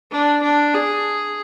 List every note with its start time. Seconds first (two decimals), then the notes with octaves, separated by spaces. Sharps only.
0.11 D4
0.43 D4
0.74 G#4